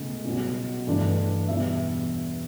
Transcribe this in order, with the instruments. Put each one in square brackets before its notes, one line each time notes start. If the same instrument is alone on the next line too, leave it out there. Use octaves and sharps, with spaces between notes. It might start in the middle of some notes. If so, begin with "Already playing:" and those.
Already playing: [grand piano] C#2 B2 A3 C#4
B1 B2 G3 C#4
G2 E3 A3 D4
E2 B2 G3 E5